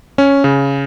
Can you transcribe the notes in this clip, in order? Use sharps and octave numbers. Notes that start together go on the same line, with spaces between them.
C#4
C#3